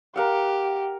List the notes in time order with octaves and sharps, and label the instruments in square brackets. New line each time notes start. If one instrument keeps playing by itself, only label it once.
[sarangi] G4 [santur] A#4 F5 F#5